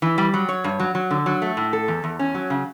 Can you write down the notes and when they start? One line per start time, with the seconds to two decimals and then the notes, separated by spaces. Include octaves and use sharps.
0.02 E3
0.18 G3
0.34 F#3
0.49 C#5
0.64 G2
0.79 F#3
0.95 F#3
1.11 D3
1.26 F#3
1.42 A3
1.57 A2
1.73 A4
1.88 E2
2.04 E2
2.19 C#4
2.35 F#3
2.50 C#3